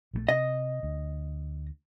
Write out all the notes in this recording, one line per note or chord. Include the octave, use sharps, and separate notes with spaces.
A#1 E3 A3
C3 D#5
D2